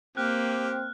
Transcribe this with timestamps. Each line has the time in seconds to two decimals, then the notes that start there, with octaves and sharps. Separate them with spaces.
0.17 A#3 C4 G4 F6 F#6